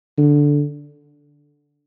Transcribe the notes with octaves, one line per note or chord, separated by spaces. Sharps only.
D3